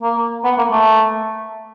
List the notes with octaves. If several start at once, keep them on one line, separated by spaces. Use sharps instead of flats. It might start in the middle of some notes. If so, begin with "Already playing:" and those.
A#3
B3
A#3
A3